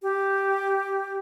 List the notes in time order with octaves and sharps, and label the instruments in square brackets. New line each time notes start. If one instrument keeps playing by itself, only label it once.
[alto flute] G4